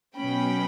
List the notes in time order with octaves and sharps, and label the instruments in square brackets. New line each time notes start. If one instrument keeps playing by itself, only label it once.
[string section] B2 F#3 C#4 G5 B5